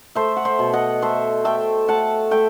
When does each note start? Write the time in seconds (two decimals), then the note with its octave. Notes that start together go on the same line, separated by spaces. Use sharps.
0.15 A3 C5 E5
0.36 F#5
0.45 C5 E5
0.59 B2
0.73 D#5 F#5
1.02 A3 C5 E5
1.45 A3 E5 G5
1.88 A3 F#5 A5
2.31 A3 E5 G5